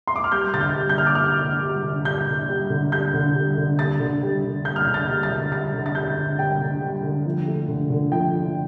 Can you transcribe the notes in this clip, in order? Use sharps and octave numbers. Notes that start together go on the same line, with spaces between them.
C6
D6
F6
G3 G6
D3 A6
G6
G3
G6
D3 F6
D6
G3 F6
D3
G3
D3
G3 G6
D3
G3
D3
G3 G6
D3
G3
D3
G3 A6
D3
G3
D3
G3 G6
F6
D3 G6
A6
G3
A6
D3
G3 A6
D3
A6
G3 G6
D3
G3 G5
D3
G3
D3
F3
A3
D3
D3
F3 G5
A3